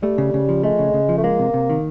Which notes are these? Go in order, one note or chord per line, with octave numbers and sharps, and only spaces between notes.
G3 A3
C#3
C#3
F3
G#3 A3
C#3
C#3
F3
A3
G#3 A#3
C3
C3
D#3